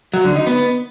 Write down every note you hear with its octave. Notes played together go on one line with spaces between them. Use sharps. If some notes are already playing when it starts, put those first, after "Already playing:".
F#3
D3
D#4
B3